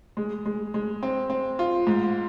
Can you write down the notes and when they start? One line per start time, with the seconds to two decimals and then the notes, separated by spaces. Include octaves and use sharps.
0.17 G#3
0.46 G#3
0.74 G#3
1.03 C4
1.30 C4
1.59 F4
1.87 G#2